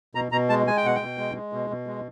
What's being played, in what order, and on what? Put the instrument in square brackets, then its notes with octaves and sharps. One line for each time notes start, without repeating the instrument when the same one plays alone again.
[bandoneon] B2 A#5
B2 A#5
G#3 A5
G#3 G#5
G5
B2 F#5
G5
B2
G#3
G#3
B2
B2
G#3